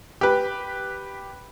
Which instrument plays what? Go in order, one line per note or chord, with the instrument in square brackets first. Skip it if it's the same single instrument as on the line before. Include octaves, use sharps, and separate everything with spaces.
[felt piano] G4 B4